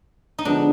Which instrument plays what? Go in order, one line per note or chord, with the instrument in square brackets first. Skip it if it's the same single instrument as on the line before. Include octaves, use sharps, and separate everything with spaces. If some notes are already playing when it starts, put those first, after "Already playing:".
[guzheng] D#4
[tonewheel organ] D3 F3 G#3 B3 [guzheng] D4